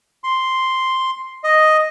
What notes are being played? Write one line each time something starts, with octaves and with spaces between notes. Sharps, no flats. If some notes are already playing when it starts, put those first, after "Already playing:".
C6
D#5